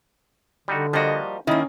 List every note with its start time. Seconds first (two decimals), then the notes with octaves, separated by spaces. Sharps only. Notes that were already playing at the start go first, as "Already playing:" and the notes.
0.68 D3 G3 D#4 F#4
0.93 F3 G3 A#3 F#4 D#5
1.47 D#3 A#3 C#4 E4 D#5 B5